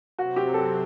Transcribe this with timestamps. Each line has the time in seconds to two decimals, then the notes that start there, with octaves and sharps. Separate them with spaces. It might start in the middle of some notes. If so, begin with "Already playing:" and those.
0.19 C3 F#3 C4 F#4
0.36 G4
0.54 A4